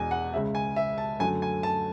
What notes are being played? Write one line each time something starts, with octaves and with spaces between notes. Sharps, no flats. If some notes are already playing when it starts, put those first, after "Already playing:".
Already playing: E1 E2 B2 G#3 G#5
F#5
C#2 C#3 G#3 E5
G#5
E5
A5
F#2 D3 F#3 A3 G#5
G#5
A5